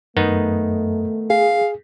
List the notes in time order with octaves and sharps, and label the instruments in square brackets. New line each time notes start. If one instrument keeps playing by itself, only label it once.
[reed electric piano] F#2 [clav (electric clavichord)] D#3 B3 D#4 [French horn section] A3
[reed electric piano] G#4 [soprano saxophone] F5